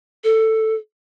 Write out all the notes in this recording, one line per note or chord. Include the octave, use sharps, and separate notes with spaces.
A4